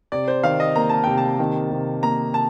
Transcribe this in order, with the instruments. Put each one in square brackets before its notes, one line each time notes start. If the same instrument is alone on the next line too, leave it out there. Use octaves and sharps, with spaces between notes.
[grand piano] C3 [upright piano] D5
[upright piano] C5
[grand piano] D#3 [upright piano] F5
[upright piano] D#5
[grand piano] A#3 [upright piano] A#5
[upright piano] A5
[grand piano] C3 [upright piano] G5
[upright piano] A5
[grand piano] D#3
C3
[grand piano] A#3 [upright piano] A#5
[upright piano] A5